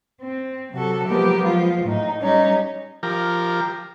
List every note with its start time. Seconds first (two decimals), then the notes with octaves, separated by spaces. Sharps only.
0.21 C4
0.73 C3 F#3 F#4 A4
1.08 F3 F#3 G#3 A#3 B3 G4
1.44 F3 G#3 F4
1.84 A2 D#4
2.20 G3 C#4 D#4
3.03 F3 G4 A#4